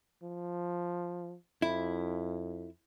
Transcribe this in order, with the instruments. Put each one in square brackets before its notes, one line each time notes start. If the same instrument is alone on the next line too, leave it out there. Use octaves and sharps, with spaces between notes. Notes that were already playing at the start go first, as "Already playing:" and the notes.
[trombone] F3
[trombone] F2 [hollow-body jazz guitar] E4